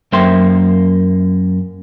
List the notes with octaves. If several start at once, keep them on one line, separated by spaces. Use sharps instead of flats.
F#2 A#3 C5 E5 G5 C6